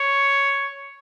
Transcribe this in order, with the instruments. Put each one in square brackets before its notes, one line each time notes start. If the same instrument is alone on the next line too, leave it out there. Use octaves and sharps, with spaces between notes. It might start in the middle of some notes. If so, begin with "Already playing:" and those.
Already playing: [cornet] C#5